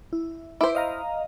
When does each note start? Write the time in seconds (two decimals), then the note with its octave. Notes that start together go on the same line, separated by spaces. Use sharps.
0.13 E4
0.61 E4 B4 C5 D6
0.75 D#5 F5 A#5